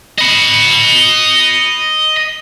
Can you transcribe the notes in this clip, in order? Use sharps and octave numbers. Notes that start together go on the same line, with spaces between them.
D#5 B5